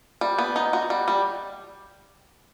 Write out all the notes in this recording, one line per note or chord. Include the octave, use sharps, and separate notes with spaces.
G3
B3
D#4
F#4
G3
G3